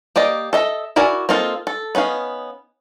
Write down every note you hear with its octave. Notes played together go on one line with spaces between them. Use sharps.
A#3 G4 D5 D#5
A4 D#5 E5
E4 F#4 A#4 D5 G#5
A#3 C4 D#4 F4 A4
A4
B3 C#4 D#4 F5